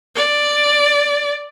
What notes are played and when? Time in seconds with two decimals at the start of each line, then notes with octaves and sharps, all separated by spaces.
0.15 D5